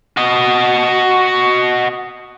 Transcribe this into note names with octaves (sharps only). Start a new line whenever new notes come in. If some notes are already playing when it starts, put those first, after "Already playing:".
F#4 D#5